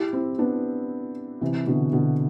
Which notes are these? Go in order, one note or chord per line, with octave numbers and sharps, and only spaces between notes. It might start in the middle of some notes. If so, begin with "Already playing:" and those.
Already playing: E4 G4
C4 E4
B3 D4
C3 E3
B2 D3
B2 D3